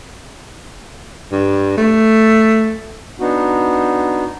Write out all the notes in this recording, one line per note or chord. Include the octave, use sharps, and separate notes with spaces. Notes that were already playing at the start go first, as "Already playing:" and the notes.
G2
A3
B3 D4 D#4 F#4